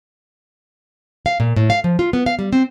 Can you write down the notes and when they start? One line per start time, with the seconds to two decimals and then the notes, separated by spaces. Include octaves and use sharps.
1.26 F5
1.40 A#2
1.56 A2
1.70 F5
1.84 F3
1.99 F4
2.13 B3
2.26 F5
2.39 G3
2.53 C4